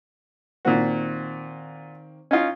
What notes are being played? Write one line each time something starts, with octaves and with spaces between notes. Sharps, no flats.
A#2 D#3 A#3 C4 F#4
C#4 D#4 F4